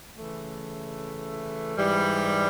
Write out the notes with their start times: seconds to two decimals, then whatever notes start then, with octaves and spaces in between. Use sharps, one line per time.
0.15 C#3 E3 A3
1.76 G#2 E3 G3